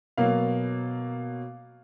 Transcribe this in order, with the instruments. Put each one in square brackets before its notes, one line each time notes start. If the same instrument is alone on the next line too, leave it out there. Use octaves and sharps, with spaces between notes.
[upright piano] B2 F#3 A#3 F5